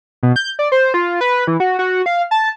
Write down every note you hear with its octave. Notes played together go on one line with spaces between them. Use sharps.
B2
G6
D5
C5
F4
B4
E3
F#4
F#4
F5
A5